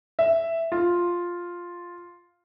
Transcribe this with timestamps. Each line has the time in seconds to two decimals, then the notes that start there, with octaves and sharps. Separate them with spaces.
0.19 E5
0.72 F4